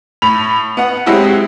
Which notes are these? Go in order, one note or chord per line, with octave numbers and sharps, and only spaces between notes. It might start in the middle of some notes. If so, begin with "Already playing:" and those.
A2 B5 F7
B3 F#5
F#3 G#3 C4 E4 F#4 G4